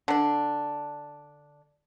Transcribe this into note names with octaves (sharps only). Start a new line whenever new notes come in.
D3 D4